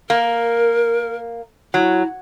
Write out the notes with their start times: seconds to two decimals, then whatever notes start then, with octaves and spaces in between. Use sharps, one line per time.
0.10 A#3 A#4
1.74 F#3 E4